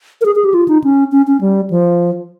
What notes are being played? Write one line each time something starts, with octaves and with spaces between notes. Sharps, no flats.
A#4
G#4
G#4
G4
F4
D#4
C#4
C#4
C#4
G3
F3